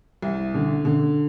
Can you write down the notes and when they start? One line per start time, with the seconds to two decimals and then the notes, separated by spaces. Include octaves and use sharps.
0.22 C2
0.54 D3
0.85 D3